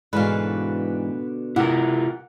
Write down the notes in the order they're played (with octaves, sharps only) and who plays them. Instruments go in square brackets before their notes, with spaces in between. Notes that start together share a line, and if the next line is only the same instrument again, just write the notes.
[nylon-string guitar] G#2 E3 G#3 [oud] B2 D3 [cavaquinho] B4 F5
[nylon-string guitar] C3 G4 [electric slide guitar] E4 F4 A#4 [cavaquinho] F#5